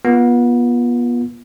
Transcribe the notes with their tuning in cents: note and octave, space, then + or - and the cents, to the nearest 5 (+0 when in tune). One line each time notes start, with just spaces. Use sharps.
B3 -35 F4 +0